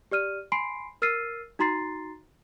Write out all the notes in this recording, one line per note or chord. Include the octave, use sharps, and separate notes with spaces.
G4 D5 F6 D#7
G#5 B5 C6 C7 D7
A#4 E6 F6 A6 C7 D#7
D#4 F#4 A#5 C6 A6 C7